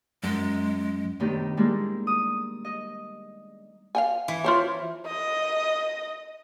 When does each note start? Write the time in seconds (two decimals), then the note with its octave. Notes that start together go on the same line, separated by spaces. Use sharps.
0.24 F#2 G#3
1.20 A2 C3 D#3 B3 D4 G4
1.57 G3 G#3 A#3 D4 E4
2.07 D#6
2.65 D#5
3.95 F5 G5 G#5
4.28 E3
4.44 F4 C5 C#5
5.07 D#5